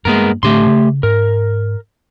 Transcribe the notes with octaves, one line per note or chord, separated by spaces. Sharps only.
G2 G#3 A#3 B3 A#4
A2 D3 A3 D4 G4 C6
C#3
G#2 A#4